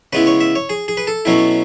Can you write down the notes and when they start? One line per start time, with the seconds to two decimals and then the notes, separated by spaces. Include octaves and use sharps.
0.13 C#3 G#3 B3 E4 B4
0.27 C#5
0.41 E5
0.56 C#5
0.69 G#4
0.88 G#4
0.97 B4
1.07 A4
1.25 B2 F#3 C#4 E4